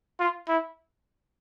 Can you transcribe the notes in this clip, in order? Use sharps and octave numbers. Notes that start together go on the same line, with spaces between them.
F4
E4